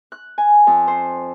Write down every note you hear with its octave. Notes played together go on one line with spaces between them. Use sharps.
F#6
G#5
F2
C5